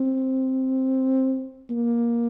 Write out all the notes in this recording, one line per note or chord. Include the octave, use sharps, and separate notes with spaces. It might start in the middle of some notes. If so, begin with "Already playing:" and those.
Already playing: C4
A#3